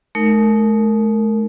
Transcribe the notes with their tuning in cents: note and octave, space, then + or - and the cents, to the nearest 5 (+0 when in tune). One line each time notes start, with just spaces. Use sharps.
A3 -40 D#4 +0 A#4 -20